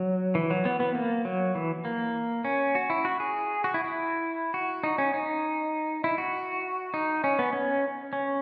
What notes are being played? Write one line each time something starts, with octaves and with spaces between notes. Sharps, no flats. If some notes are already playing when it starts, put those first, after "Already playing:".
Already playing: F#3
E3
F#3
B3
B3
A#3
F#3
E3
A#3
C#4
F#4
E4
F#4
G#4
F#4
E4
E4
F#4
D#4
C#4
D#4
E4
F#4
D#4
C#4
B3
C#4
C#4